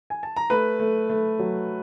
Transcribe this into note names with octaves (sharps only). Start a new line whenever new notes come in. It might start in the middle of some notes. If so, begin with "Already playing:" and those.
G#5
A5
A#5
A3 B4 B5
A3
A3
F#3